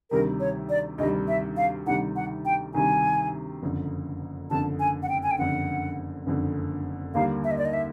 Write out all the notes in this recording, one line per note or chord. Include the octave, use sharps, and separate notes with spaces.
D2 C3 D#3 G3 A#4
C#5
D5
D2 C3 D#3 G3 D#5
E5
F5
D2 C3 D#3 G3 F#5
F#5
G5
D2 C3 D#3 G3 G#5
F#1 F2 D3
F#1 F2 D3 A5
G#5
F#5
G5
G#5
G5
F#1 F2 D3 F#5
F#1 F2 D3
D#2 D3 G3 A#3 F5
E5
D#5
D5
D#5
E5